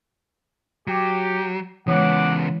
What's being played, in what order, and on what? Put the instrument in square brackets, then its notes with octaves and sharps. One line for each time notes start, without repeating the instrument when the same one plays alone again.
[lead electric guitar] F#3 [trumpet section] G4
[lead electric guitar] C#3 B3 [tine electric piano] E3 [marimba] G#3 C#5 [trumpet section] F#5 D6